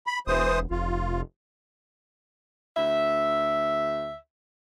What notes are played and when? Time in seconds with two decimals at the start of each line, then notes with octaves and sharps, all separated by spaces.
0.07 B5
0.27 E1 E3 C5 D#6
0.71 F1 F4
2.77 D2 E5